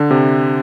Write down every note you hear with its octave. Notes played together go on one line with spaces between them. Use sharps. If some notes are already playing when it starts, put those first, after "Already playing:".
Already playing: D3
C3